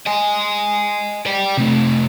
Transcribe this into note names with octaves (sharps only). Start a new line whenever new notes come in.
D#5 G#5
D5 G5
C3 A3